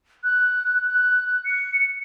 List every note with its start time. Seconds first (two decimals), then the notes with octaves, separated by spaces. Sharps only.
0.24 F#6
0.87 F#6
1.46 C#7